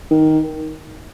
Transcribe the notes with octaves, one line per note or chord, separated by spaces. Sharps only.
D#3